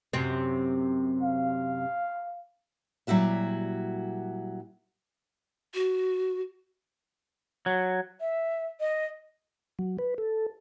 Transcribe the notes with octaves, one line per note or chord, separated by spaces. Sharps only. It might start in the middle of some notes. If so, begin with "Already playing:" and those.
F#2 C3 C4
F5
A#2 F#3 G3 E4 F#4 E5
F#4
F#3
E5
D#5
F#3
B4
A4